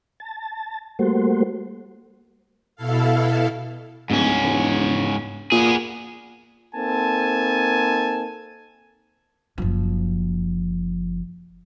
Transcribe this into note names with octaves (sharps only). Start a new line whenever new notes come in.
A5
G3 A3 A#3 F#4 C5
B2 E4 A4 F5
D1 G#2 C#4
E1
A#2 B3 G#4
A#3 C4 D#4 A4 G#5 A5
F#1 F3